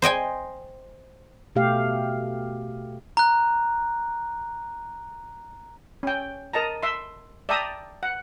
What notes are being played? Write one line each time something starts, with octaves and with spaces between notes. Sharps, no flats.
C5 D#5 G5 G#5
B2 A3 G4 F5
A#5 F#6
C#4 G5
A#4 D#5 A5 A#5
E5 C6
D5 E5 G5 A5 A#5 D#6
F#5